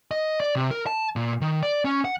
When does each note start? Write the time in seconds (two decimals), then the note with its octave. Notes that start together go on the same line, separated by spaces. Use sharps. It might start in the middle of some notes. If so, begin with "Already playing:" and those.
0.11 D#5
0.40 D5
0.56 C3
0.71 A#4
0.87 A5
1.16 A#2
1.41 D#3
1.63 D5
1.85 C#4
2.05 F#5